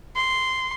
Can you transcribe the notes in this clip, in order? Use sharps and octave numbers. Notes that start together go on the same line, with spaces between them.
C6